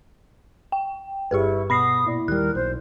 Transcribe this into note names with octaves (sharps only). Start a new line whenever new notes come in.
G5
G1 G2 E4 G4 G#4 B4 C#6
B2 F#5 B5 D#6 A#6 C7
A#2 E4 D5
D#2 G3 A#4 F#6
B1 C5